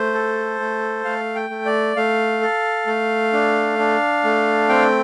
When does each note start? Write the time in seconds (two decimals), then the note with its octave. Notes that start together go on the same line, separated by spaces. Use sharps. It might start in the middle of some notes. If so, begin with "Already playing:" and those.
Already playing: A3 C5
0.14 A4
0.60 A3
1.05 A3 F5
1.35 G5
1.50 A3
1.65 D5
1.96 A3 F5
2.41 A4
2.87 A3
3.33 D4
3.78 D4
4.24 A3
4.69 C4 G5